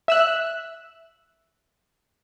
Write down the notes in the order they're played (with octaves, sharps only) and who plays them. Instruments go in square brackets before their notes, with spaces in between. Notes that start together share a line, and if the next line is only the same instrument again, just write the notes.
[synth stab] E5 E6 F#6